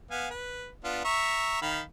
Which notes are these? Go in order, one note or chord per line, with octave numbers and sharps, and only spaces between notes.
B3 F5 G#5
B4
B3 D4 F4
E5 A#5 C#6
D#3 F5 B5